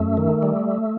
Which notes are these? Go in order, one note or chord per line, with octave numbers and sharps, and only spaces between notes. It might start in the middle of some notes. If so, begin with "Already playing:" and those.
Already playing: F#2 A3
D#3
G3